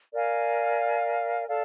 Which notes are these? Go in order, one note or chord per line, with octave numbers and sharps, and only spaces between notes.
A#4 D5 F5 G#5
A4 D5 F5